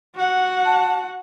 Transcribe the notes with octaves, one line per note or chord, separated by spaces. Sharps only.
F#4 F#5
A5